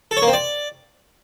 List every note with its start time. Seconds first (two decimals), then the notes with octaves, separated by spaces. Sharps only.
0.11 A4
0.17 C#5
0.22 A#3
0.28 C4
0.33 D5